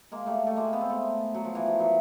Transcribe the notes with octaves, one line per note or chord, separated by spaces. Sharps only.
G#3 A#3
G3 A3
A3
G#3 A#3
B3
C4
A3 B3
F#3
F3
E3
F3
E3 F#3